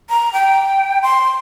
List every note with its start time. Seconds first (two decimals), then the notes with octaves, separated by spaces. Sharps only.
0.10 A#5
0.33 G5
1.03 C6